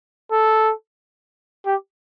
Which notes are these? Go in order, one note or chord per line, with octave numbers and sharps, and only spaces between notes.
A4
G4